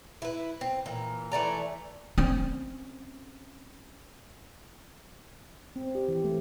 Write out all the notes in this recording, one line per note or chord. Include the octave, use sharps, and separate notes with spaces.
E4 B4
C4
A#2 E3
E3 A3 D5 A#5
C4 C#4
C4
G4
E3
A3